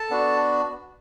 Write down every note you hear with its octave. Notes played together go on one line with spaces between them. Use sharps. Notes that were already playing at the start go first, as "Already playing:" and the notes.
Already playing: A4 A5
B3 D4 F#4